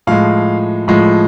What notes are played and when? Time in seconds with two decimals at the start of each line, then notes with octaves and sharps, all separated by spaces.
0.07 A2 F3 G#3 F5
0.88 A2 F3 G#3